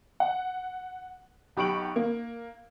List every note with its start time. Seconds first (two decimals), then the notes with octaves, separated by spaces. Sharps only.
0.20 F#5
1.57 B1 G4 B5 C#6 D7 F#7
1.96 A#3